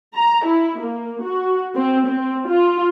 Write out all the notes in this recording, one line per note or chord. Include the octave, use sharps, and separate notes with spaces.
A#5
E4
A#3
F#4
C4
C4
F4